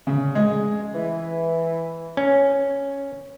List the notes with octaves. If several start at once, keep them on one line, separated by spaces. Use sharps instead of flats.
C#3
G#3
E3
C#4